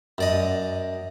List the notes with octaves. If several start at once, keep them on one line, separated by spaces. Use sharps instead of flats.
F#2 D5 D#5